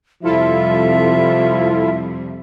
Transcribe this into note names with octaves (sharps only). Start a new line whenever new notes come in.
F2 C3 F3 G3 E4 F4 A4 E5